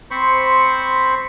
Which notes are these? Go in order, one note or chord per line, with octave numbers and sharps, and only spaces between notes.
C4 C5 B5 C#6